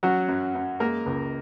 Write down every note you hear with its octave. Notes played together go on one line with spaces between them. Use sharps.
F#3 C#4 F#4
F#2
F#2
G#3 A#3 A#4
C#2